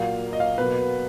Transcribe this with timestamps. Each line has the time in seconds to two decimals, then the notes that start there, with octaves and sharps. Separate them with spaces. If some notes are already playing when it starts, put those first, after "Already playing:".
Already playing: A#2 F#3 A#3 F5
0.33 D#5
0.40 F5
0.58 B2 F#3 A#3 B4